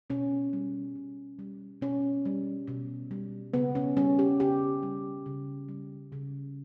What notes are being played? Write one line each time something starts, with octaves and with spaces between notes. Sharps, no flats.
B2 C#4
G3
B2
G3
B2 C#4
G3
B2
G3
C#3 B3
C#4
G3 C#4
G4
C#3 G4
G3
C#3
G3
C#3